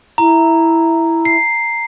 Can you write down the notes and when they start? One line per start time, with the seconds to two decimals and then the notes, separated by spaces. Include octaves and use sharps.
0.18 E4 A#5
1.25 C7